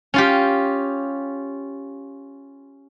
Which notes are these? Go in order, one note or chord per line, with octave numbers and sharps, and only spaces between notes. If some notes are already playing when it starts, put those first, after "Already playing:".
C#4 F4 G4